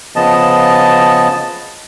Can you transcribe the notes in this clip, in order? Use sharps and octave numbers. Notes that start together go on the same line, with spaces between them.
C#3 F3 B3 D#5 A5